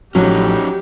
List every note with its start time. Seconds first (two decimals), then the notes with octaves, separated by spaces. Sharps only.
0.15 A1 A2 F3 F#3 C#4 D#4 G4